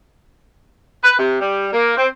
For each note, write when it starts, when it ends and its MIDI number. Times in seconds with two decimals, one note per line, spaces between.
1.03 1.18 71
1.19 1.37 48
1.39 1.68 55
1.73 1.95 58
1.97 2.07 60